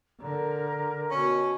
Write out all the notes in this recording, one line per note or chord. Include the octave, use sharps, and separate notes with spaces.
D3 A#4 A#5
B2 C#4